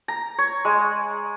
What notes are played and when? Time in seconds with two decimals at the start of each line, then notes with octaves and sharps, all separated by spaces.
0.08 A#5
0.38 C#5
0.65 G#3